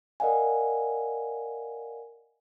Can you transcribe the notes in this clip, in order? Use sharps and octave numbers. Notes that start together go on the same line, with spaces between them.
A#4 D5 D#5 F5 F#5 G#5